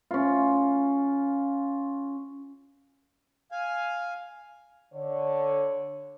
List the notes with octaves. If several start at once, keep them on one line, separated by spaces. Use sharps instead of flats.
C#4 F4
F5 G#5
D3 C#5